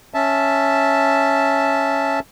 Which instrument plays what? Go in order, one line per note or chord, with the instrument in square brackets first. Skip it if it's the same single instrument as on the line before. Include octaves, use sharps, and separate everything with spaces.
[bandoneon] C#4 E5 A5